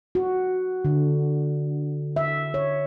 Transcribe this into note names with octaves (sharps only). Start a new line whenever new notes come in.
F#4
D3
E5
C#5